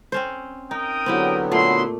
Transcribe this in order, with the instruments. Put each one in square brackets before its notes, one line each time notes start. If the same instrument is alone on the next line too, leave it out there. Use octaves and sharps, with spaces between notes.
[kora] C4 C#4 C5
[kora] D#4 [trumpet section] A#4 G5 D#6
[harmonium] D3 F#3 B3 [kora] C4 E4 G4
[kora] A#2 A3 [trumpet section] E4 C6